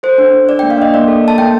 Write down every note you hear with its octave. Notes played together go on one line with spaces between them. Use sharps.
A4 C5
D4
D4
D4 D5
G5
A#3
F5
D4 D#5
A#3 D5
A4
A4 A5
A#3 G5